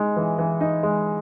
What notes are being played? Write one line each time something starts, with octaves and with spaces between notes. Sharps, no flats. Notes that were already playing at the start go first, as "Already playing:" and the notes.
Already playing: G#3 D#4
E3
E3
D#4
G#3